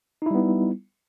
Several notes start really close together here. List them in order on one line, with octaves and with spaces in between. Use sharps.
D#4 E4 G3 B3